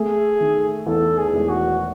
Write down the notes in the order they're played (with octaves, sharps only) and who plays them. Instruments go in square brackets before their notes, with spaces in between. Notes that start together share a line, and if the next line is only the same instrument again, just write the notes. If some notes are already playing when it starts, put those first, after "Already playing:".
Already playing: [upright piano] A3 [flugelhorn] G#4
[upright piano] D#3
[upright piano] E2 [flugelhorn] A4
[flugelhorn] G#4
[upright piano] E1
[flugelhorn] F#4